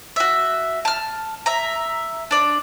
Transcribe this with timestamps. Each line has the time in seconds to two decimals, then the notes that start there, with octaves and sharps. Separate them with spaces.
0.16 F#4 E5
0.85 A5 F6
1.46 E5 A#5
2.31 D4 D5